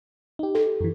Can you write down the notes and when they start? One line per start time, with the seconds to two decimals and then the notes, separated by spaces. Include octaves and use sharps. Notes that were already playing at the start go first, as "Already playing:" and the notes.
0.39 D#4 G4
0.55 A4
0.80 F#2 E3